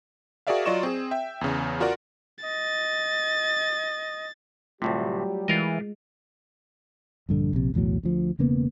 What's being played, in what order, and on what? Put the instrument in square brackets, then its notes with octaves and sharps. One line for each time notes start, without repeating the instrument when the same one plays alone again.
[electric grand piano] F#4 G#4 A#4 D5 E5 F5
F#3 F4 D5 D#5 C#6 E7
C4 G#4
E5 G5
E2 C#3
F4 F#4 A#4 D5 F#5
[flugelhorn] D#5 [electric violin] A6
[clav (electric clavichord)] D2 A2 C3 [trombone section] F#3 G3 G4 [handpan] A3 F4
[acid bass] E3 [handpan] G#3 [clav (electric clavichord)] F4 A#4 D#5
[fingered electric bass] A#1 G2 D3
A#1 C3
B1 E2 A2 F#3
D2 F3
E1 C#3 A#3 B3